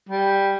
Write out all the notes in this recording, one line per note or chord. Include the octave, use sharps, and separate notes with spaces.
G3